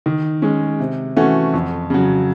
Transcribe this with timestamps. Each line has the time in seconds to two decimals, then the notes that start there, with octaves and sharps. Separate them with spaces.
0.06 D#3
0.42 G#3 C#4
0.80 C3
1.16 E3 A3 C#4 F#4
1.53 F2
1.90 C#3 F#3